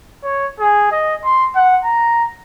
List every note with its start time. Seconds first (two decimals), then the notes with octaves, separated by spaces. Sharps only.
0.24 C#5
0.60 G#4
0.92 D#5
1.25 C6
1.56 F#5
1.84 A#5